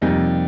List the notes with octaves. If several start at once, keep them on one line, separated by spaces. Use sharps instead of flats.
F2 C3 G3 A#3 D#4